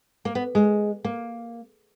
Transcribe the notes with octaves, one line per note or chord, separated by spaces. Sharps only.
A#3
B3
G#3
A#3